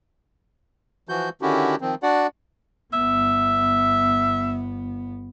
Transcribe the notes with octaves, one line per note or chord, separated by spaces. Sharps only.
E3 F3 F#4 G6
D3 D#3 C#4 E4 F#4 G4
D#3 F3 C4
D4 F#4 D5 F#5
G1 B3 E5